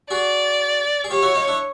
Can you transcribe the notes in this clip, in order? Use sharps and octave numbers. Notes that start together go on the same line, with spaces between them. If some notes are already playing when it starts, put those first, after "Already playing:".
F#4 G#4 D5
G#4
F4 G4 C#5
E4 F#4
D#4 F4
D4 E4